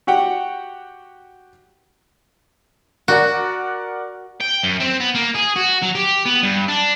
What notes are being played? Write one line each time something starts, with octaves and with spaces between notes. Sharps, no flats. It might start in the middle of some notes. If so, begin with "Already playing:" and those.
F#4 G4 F#5 G5
F#4 A#4 D5 F#5
G5
F#2
C4
B3
A#3
G#4
F#4
F#3
G4
B3
G2
D4